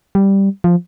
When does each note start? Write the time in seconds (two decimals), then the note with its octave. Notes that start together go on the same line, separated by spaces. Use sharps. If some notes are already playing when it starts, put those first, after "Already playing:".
0.15 G3
0.64 F3